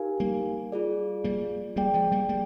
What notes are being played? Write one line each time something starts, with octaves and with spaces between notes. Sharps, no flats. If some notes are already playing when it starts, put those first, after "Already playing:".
Already playing: D#4 G4 A#4 F5 G#5
G3 A#3
F4 G#4 D5
G3 A#3
G3 A#3 G#4 D5 G5
F3 G#3
G3 A#3
G3 A#3